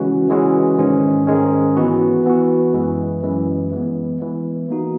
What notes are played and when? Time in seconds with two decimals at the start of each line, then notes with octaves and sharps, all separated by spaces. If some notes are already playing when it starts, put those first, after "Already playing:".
Already playing: C#3 E3 G#3 C#4 F#4
0.29 C#3 E3 G#3 C#4 F#4
0.78 G#2 D#3 G#3 C#4
1.27 G#2 D#3 G#3 C#4
1.77 E3 B3 F#4
2.26 E3 B3 F#4
2.74 F#2 E3 G#3
3.23 F#2 E3 G#3
3.72 E3 G#3 B3
4.20 E3 G#3 B3
4.69 E3 A#3 D#4 F#4